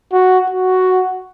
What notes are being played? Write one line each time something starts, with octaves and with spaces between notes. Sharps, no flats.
F#4
F#4